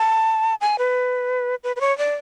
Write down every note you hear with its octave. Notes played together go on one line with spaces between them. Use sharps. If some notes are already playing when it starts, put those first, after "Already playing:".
Already playing: A5
G#5
B4
B4
B4
C#5
D5